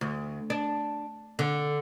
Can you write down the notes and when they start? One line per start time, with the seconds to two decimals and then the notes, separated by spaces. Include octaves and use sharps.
0.01 D2
0.50 D4
1.39 D3